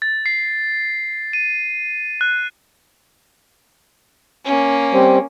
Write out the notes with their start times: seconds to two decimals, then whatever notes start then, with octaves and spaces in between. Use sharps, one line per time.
0.02 A6
0.26 C7
1.33 D#7
2.21 F#6
4.45 A#3 C#4
4.93 G3 C4